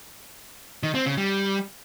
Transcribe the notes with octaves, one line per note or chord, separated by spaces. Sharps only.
D#3
C4
C#3
G3